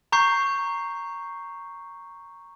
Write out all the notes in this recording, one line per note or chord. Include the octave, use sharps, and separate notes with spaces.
A#5 C#6 G6 C7